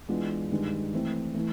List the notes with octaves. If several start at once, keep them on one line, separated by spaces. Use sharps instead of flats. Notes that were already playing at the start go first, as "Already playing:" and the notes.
E3 G#3 B3 D4 F4
G2 D#3 G#3
E3 A3 C4
E3 A3